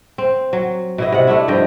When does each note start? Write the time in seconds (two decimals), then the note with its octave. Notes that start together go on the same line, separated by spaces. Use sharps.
0.18 C4
0.53 F#3
0.98 B2 E4 D#5
1.12 C3 F#5
1.27 A3 D4 E4
1.48 G2 F3 D#5 G5